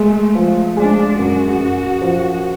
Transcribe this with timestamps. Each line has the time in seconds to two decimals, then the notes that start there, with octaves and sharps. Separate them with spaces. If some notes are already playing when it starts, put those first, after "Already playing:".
Already playing: G#3 A3
0.35 F3
0.77 G#3 D4
1.18 F#2 F#4
1.60 F#2
2.02 F3